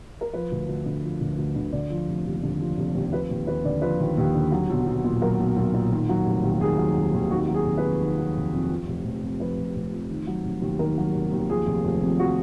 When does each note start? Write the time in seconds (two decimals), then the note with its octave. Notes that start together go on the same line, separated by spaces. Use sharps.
0.21 A#4
0.33 F3 B4
0.51 D2
0.69 D2
0.86 D3
1.03 F3
1.20 D2
1.38 D2
1.56 D3
1.73 D3 D5
1.90 F3
2.08 F1
2.25 D#2
2.43 D3
2.60 F3
2.78 F1
2.95 D#2
3.12 F3 B4
3.30 D#2
3.47 D#2 B4
3.64 D3 D5
3.82 F3 B4
4.00 D#2
4.18 D#2
4.34 D3
4.52 F#3
4.70 B1
4.87 B1
5.04 A#2
5.22 F#3 A#4
5.40 B1
5.56 B1
5.74 A#2
5.92 D#3
6.09 F#3
6.26 F1
6.44 D#2
6.61 D#3 G#4
6.78 F#3
6.96 F1
7.14 D#2
7.30 D#3 F#4
7.48 F#3
7.54 G#4
7.65 F1
7.77 B4
7.83 F2
8.00 D#3
8.18 F#3
8.36 F1
8.53 F2
8.70 F3
8.88 F1
9.05 F1
9.23 F2
9.40 F3 B4
9.57 F1
9.75 F1
9.92 F2
10.10 D#3
10.27 F#3
10.45 F1
10.62 D#2
10.79 D#3 A#4
10.98 F#3
11.14 F1
11.32 D#2
11.49 F3 G#4
11.66 F1
11.85 F1
12.02 F2
12.19 F3 F#4